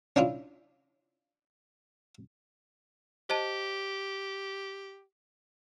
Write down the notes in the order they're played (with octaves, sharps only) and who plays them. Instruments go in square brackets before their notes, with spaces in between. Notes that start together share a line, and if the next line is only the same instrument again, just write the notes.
[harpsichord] C#4 D4 E4 F4
[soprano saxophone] G4 [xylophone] C5 D#5 A5